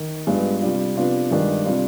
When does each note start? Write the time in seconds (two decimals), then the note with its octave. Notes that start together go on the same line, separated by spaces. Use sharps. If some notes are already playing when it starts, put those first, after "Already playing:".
Already playing: D#3
0.27 G2 F3 G#3 B3 D4
0.62 C3 G3 D4 F4
0.96 C3 F3 B3 D4 F4
1.31 G2 D#3 G#3 D4
1.65 C3 G3 D4 F4